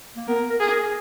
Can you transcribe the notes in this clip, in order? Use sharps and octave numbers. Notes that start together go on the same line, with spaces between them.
A#3
B3 A#4
A#4
G#4
A#4